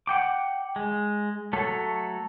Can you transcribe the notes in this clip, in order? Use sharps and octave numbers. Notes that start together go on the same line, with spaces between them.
F#5 G5 D6
G#3
F#3 A3 A4 C#5